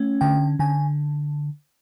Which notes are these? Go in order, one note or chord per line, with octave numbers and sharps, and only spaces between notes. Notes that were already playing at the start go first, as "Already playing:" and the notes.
Already playing: A3 C#4
D3 G5
D3 G#5